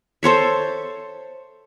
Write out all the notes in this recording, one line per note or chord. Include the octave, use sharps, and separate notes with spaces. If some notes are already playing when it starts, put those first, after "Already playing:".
A4 C5 C#5 E5